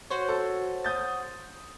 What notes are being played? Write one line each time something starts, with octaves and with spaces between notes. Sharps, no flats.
F#4 C5 C#5
A4
D#6 G6 A6